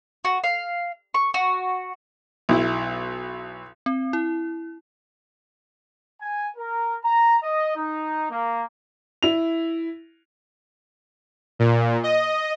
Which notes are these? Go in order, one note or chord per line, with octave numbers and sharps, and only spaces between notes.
F#4
F5
C#6
F#4
B1 E4
C4
E4
G#5
A#4
A#5
D#5
D#4
A#3
E4 F7
A#2
D#5